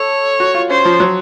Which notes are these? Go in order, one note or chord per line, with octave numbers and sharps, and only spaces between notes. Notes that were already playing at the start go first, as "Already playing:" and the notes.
Already playing: A4 C#5
F#4
F4
C#4 C5
F3
F#3